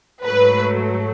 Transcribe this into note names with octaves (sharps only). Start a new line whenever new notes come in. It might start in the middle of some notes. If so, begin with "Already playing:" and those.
G#2 F#3 A3 B4